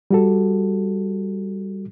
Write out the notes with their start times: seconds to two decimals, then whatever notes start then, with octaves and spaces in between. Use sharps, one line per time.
0.11 G3 F#4 A4